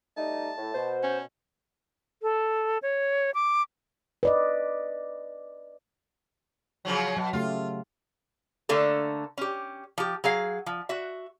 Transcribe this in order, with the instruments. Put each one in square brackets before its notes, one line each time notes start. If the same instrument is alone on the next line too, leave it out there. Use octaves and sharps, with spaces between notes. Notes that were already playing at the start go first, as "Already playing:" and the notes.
[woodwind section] G3 A3 D#4 [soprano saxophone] A5
[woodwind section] A2
[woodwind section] B2 [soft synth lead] C5
[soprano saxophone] C#4
[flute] A4
C#5
D6
[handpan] B4 D5 D#5
[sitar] C#3 F3 F#3
[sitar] B2 [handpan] F#3
[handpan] C#3 A3 G4 [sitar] F4
[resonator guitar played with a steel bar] D3 A3 A#3 A4
C#4 G4
F3 G4
F#3 G#4 F5
F3
F#4 E5